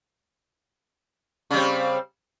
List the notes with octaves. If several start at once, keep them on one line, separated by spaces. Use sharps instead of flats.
C#3 G3 C4